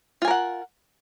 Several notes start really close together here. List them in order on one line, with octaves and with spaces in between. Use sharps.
F4 G#5 A#4 F#5